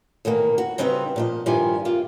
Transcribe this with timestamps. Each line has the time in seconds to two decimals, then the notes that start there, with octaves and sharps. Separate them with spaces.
0.25 E2 B2 D#3 A#3
0.58 F#4
0.78 C#3 G3 C4 D#4 E4 B4
1.16 A#2 F3 D#5
1.46 G2 D#3 F3 G3 E4 G#5
1.85 C3 A#3 F4